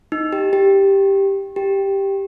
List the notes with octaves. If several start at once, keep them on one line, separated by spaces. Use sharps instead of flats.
D#4
G4
G4
G4